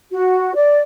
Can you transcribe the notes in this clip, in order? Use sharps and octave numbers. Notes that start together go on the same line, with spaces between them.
F#4
D5